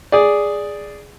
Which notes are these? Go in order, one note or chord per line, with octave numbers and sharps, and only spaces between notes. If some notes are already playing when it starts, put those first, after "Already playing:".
G#4 D5